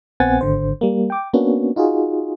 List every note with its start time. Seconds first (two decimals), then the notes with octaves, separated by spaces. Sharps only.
0.20 A#1 B3 C4 F#5 G#5 A6
0.41 G#1 D3 C5
0.81 G3 A#3
1.10 G5 D6
1.33 A#3 B3 C#4 D4 F#4
1.76 D#4 F4 F#4 G#4